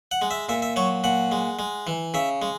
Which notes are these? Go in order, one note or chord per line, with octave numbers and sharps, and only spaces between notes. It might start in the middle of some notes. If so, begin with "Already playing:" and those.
F#5
G#3
E5
A#2 E5
E5
F#3 C#5
A#2 F#5
G#3
G#3
E3
C#3 E5
G#3